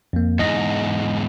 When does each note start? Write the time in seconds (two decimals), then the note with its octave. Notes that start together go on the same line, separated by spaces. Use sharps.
0.13 F2 A#3
0.39 E2 G#2 D#5 A#6